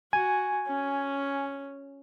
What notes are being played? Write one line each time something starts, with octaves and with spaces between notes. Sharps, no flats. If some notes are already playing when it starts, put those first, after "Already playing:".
F#4 G#5
C#4